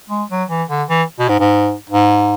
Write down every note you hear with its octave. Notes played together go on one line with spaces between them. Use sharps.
G#3
F#3
E3
D3
E3
B2
G#2
G#2
G#2